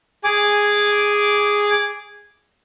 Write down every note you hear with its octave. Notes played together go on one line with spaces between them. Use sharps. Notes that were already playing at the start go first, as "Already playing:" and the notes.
G#4 G#5 D6